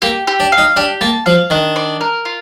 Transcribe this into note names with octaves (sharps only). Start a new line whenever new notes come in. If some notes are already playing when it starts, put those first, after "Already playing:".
A#3 G4
G4
D4
F5
D#4
D4 G4
A#3 A5
F3 F5
D#3 D4
D5
A#4
F4